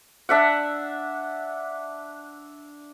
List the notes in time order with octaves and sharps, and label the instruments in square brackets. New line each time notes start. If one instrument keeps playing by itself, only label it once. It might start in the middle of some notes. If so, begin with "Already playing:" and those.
[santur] D4 E5 F#5